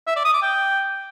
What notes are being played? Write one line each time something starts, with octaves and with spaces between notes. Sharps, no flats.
E5
D5
D#6
D6
G5